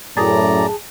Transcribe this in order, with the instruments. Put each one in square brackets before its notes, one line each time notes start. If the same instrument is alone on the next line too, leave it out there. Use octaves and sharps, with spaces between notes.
[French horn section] F#2 A2 [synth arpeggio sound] G#4 A5 [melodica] D5 A#5